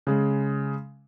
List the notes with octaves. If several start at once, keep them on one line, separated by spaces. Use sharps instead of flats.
C#3 G#3